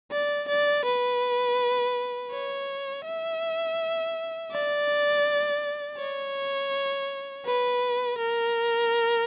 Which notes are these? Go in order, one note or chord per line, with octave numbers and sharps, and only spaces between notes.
D5
D5
B4
C#5
E5
D5
C#5
B4
A#4